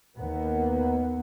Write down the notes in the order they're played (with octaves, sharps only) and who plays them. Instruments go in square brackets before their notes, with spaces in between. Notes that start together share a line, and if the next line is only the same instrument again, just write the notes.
[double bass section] D#2 A#3 B3